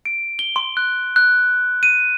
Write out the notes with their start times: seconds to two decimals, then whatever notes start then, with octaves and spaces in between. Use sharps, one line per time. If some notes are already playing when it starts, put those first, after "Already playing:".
0.06 D7
0.39 G7
0.56 C6
0.77 F#6
1.16 F#6
1.83 D#7